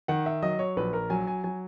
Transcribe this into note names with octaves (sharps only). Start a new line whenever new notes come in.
D#3 F#5
E5
F#3 D#5
C#5
A#1 B4
A#4
F#3 G#5
G#5
F#3 G#5